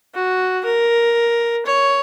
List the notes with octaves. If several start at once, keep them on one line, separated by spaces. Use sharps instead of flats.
F#4
A#4
C#5